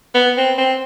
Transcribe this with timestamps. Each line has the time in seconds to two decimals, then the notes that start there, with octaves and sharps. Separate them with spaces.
0.15 B3
0.37 C4
0.58 C4